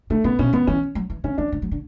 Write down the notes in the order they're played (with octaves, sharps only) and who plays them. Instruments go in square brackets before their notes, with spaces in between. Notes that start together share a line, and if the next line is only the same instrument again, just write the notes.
[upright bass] D3 [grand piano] A3
[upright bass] C#3 [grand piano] B3
[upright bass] B2 [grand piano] C#4
[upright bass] E3 [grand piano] B3
[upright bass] E3 [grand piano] C#4
[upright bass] F#3
E3
[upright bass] D3 [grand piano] C#4
[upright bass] E3 [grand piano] D4
[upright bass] D3
F#3
D3